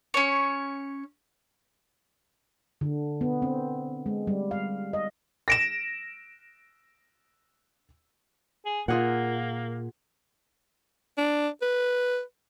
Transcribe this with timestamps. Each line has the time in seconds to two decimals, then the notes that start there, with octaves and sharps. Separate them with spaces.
0.14 C#4 C#5
2.81 D3
3.21 B3
3.42 C4
4.06 G#3
4.27 G3
4.51 F5
4.93 D#5
5.48 A#6 D7 E7
8.66 G#4
8.88 A#2 A#3 F4 G#4 F#5
11.18 D4
11.62 B4